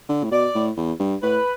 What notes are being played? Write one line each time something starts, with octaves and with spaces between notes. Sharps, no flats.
D3
A2
B2 D5
A2
E2
G2
A2 B4